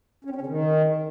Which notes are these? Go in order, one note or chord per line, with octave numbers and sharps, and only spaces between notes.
C#4
C4
C#4
C#3
D#3